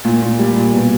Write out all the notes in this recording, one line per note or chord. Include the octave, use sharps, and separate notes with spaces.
A#2
A#2
G3
A#2
B2